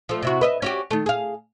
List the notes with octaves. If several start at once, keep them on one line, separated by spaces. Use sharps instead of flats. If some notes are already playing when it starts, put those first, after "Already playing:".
F3 A3
C3 E4 F#4
B4 D#5 E5
C#4 F#4 G4
D#3 A3
G#4 F5